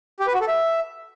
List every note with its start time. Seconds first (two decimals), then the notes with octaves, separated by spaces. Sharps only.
0.20 G4
0.27 B4
0.34 F#4
0.41 A4
0.48 E5